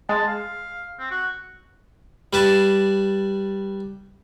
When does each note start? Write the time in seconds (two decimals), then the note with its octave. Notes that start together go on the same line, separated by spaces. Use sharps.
0.09 G#3 A5
0.28 F5
0.99 C4
1.11 F#4
2.33 G3 B4 A5